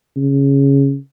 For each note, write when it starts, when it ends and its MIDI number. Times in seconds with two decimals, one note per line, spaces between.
0.17 0.96 49